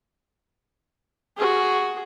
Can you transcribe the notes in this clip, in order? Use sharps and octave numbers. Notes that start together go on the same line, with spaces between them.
F#4 G#4